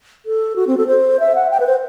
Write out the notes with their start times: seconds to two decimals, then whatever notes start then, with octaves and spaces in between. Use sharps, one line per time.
0.26 A4
0.56 F#4
0.67 C4
0.77 A4
0.87 C5
1.20 E5
1.35 F#5
1.51 G5
1.60 B4
1.67 C5